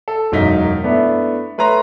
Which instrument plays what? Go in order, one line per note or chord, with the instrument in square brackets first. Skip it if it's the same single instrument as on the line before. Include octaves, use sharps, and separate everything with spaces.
[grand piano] A4
E1 F#2 D#4 B6
A3 B3 D4 E4
A3 B4 C#5 A#5 C6